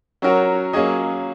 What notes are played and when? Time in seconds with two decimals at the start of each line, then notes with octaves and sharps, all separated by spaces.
0.22 F#3 C#4 F#4 A#4
0.73 F#3 A#3 C#4 G#4 D#5